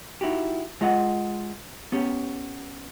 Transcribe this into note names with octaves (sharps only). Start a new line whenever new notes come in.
D#4 E4 F#4 G4
G#3 F4 D#5 F#5
B3 C#4 G4